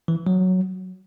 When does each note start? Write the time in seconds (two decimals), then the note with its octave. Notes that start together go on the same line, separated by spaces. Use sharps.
0.08 E3
0.27 F#3